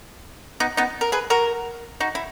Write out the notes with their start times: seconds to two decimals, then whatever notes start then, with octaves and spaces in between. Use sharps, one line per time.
0.60 B3 D#4
0.77 B3 D#4
1.01 A#4
1.12 G#4 B4
1.30 F#4 A#4
2.00 D#4 F#4
2.15 E4